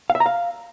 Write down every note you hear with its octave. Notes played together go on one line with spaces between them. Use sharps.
F5
E5
A#5
F5